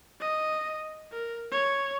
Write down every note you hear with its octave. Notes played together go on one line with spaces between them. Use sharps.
D#5
A#4
C#5